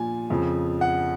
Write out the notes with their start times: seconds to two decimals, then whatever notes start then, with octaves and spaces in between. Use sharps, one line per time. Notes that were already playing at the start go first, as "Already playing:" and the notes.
Already playing: A#2 F3 G#5
0.30 F2 C#3 F3
0.81 F#5